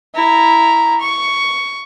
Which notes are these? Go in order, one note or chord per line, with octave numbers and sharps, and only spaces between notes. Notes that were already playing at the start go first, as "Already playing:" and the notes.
E4 A#5
C#6